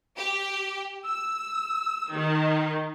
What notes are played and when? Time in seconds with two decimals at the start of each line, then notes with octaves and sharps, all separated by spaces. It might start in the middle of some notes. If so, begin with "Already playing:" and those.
0.16 G4
1.04 E6
2.12 D#3